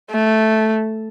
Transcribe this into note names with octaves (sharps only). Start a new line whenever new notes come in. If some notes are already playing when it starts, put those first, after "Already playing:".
A3